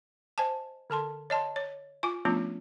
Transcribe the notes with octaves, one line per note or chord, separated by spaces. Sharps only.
C5 D#5 G#5 A5
D3 A4 A5 C6
C#5 D#5 A5 C6
C#5
F4 G#5 D6
F3 A3 B3 C#4 D4 F4